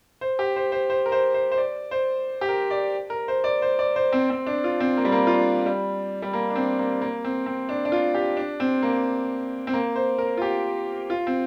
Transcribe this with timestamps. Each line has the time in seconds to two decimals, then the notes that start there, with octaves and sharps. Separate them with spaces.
0.21 C5
0.39 G4
0.56 C5
0.72 C5
0.90 C5
1.06 A#4
1.12 C5
1.34 C5
1.52 C5
1.58 D5
1.91 C5
2.41 G4
2.49 A#4
2.71 D5
3.10 A#4
3.28 C5
3.44 D5
3.62 C5
3.79 D5
3.96 C5
4.12 C4
4.30 C4
4.46 D4
4.64 F4
4.80 C4
4.97 A#3
5.05 G3
5.12 A#3
5.27 F4
5.32 D4
5.66 G3
6.22 G3
6.33 A#3
6.50 D4
6.56 C4
6.79 A#3
7.01 A#3
7.24 C4
7.46 C4
7.69 D4
7.85 D4
7.92 F4
8.14 G4
8.37 D4
8.60 C4
8.82 A#3
9.67 C4
9.73 A#3
9.96 C5
10.18 A#4
10.37 F4
10.42 G4
11.10 F4
11.27 C4